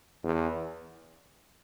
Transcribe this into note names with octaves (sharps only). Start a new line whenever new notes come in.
E2